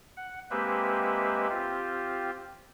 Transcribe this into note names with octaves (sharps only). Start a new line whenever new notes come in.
F#5
G#3 A#3 C4 G4 B4 E5
C4 F4 G4